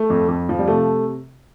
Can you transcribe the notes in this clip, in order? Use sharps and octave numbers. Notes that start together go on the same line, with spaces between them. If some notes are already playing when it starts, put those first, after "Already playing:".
Already playing: A3
F2
F2
F3
G3
C3 A3